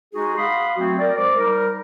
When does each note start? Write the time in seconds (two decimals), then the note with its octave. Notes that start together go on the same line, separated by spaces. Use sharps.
0.14 G#3 D#4 F#4 G#4
0.37 F5 F#5 B5 C6 D#6
0.77 F#3 A3 C4 F#4
0.99 A#4 D5
1.17 G#3 C5 D6
1.36 G3 D#4 A#4